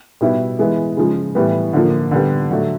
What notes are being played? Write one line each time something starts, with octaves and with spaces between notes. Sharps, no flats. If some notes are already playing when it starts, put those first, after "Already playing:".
B2 G3 B3 E4
E3 G#3 B3
C#3 F3 G#3
A2 E3 G3 B3
D3 F3 A#3
D3 G3 B3
D3 F#3 A3